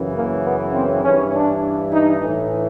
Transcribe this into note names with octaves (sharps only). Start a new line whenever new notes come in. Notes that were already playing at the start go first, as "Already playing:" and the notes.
Already playing: F#2 C#3 E3
A#3
B3
C4
G2 E3 C#4
D4
D#4
A2 E3